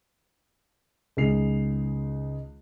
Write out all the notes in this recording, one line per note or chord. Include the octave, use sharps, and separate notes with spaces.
C#2 D#3 G#4 C7 F7